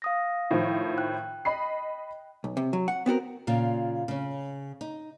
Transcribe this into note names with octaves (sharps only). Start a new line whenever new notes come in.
F5 D#6 A#6
A2 D#3 F3
G5 F#6
D#5 B5 C7
B1
C3
F#3
F#5
B3 C4 F#4 A#4
A#2 C#3 F4
C#3 C#4
D#4